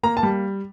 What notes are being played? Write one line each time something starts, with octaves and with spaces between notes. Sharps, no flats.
A#3 A#5
A5
G3